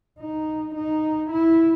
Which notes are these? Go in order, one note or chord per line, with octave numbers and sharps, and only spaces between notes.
D#4
D#4
E4